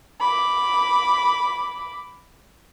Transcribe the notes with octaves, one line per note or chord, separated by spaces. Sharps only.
B5 D6